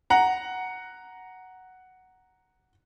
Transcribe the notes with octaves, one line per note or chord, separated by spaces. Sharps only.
F#5 A#5